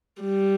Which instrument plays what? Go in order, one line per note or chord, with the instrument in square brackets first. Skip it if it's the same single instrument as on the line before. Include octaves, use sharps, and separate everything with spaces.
[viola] G3